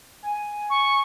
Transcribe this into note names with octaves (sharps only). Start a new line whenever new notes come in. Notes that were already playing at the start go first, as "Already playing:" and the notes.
G#5
C#6